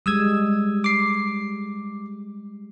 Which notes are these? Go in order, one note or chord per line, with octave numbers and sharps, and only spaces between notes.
G3 G#3 D#6 E6 G#6
D6 C7